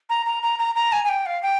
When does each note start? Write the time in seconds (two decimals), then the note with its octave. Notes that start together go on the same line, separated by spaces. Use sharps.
0.09 A#5
0.25 A#5
0.42 A#5
0.58 A#5
0.75 A#5
0.92 G#5
1.04 G#5
1.08 G5
1.25 F5
1.42 G5